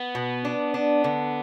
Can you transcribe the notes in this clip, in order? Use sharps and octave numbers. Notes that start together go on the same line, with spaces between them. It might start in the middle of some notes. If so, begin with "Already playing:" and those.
Already playing: B3
B2
D4
D4
D3